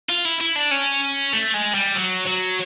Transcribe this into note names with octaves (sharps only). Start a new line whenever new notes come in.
F4
E4
E4
D4
C#4
A3
G#3
G3
F#3
F#3